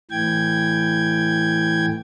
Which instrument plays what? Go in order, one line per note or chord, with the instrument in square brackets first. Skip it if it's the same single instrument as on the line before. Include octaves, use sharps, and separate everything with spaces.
[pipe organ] A2 E3 G5 G#6